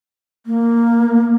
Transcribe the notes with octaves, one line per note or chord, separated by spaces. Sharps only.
A#3